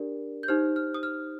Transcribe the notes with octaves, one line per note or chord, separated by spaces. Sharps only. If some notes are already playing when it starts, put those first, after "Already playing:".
Already playing: D4 G4 A#4 D5
G6
D#4 G4 C5 F6
F6
D#6
F6